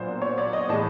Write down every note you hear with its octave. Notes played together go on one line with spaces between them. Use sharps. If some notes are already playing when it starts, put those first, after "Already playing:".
Already playing: A#2 F#3 B3 D4 C5
C#5
D5
D#5
A2 E3 G#3 A5